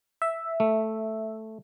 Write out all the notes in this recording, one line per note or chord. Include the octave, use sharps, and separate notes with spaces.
E5
A3